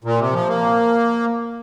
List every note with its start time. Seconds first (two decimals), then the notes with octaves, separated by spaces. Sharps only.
0.04 A#2
0.19 C3
0.33 F3
0.48 A#3